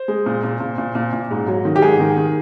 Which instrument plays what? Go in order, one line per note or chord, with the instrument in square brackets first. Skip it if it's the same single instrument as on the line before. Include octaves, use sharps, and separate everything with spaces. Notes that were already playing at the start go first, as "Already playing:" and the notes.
Already playing: [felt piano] C5
G#3
A#2
A#2
A#2
A#2
A#2
A#2
G#2
F#3
D#3
G4
G#2 G#4
D#3
D#3